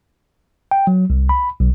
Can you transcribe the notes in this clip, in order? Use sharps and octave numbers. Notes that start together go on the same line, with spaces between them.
G5
F#3
C2
B5
B1